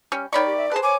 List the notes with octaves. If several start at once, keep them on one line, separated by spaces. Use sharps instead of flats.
G3 C#4
D#3 C#5 D5 B5 C#6
G4
E5
G#4 B4 C5 A5
C#5 G#5 D6